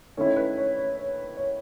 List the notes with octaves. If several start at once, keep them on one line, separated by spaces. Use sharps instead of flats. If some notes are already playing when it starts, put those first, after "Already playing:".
D#3 A3 C#4 E4 C#5
B4
C#5
C#5
C#5
C#5